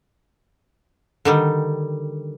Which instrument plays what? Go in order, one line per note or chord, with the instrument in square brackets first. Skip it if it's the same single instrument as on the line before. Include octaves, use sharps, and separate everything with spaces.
[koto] D3 D#3 G3